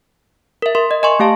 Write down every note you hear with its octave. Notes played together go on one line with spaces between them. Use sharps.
A#4 E5
A#4 E5 C6
D#5
D#5 G#5 C6 C#6
A3 G4 F5 A5